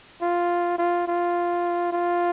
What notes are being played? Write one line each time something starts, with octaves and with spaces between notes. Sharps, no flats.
F4
F4
F4
F4